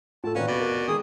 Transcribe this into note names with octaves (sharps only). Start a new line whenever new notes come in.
A2 F4 A4 A5
A#2 D#3 C#4 F#4 B4 F5
F1 B2 F#4 D5
A#4
D#3 G#3 G#4 D#6